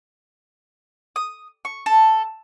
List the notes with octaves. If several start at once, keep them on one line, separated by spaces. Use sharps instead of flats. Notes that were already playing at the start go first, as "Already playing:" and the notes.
D#6
C#6
A4